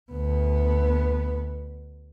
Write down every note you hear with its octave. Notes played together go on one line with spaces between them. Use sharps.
D2 B3